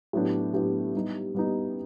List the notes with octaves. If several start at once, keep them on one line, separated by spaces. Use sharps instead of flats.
A2 F#3 B3 D4 G4
A2 F#3 B3 D4 G4
G3 B3 D#4
G3 B3 D#4